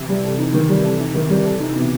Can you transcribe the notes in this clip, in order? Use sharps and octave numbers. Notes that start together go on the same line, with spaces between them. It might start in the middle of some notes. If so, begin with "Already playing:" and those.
Already playing: C3 E3
G3
A4
D#4
D#3
G3
A4
D#4
D#3
G3
A4
D#4
B2